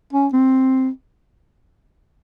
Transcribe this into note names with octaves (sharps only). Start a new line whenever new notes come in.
C#4
C4